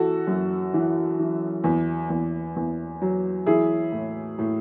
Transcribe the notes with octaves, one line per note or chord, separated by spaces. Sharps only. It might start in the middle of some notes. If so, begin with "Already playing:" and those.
Already playing: E3 F#4 A4
F#2
E3
E3
E2
E2
E2
F#3
E3 E4 G#4
A2
A2